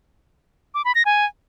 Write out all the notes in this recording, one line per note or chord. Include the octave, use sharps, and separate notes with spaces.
D6
B5
A#6
G#5